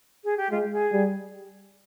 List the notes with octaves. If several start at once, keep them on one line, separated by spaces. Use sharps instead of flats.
G#4
G4
G#3 F4
G#4
G3